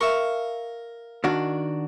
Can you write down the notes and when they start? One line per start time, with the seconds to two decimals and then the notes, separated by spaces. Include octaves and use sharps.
0.01 A#4 E5 F5 C#6
1.24 D#3 D4 F#4